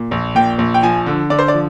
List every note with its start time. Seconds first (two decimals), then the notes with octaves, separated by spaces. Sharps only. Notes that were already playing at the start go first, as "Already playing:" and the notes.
Already playing: A#2
0.11 A#1
0.35 A#2 G5
0.58 A#1
0.74 G5
0.83 F3 G#5
1.06 D3
1.30 D3 D5
1.39 C5
1.48 D5
1.54 F3